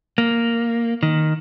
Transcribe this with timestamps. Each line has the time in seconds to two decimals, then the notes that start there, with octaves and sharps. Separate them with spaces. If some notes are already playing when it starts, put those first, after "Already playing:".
0.18 A#3
1.03 D#3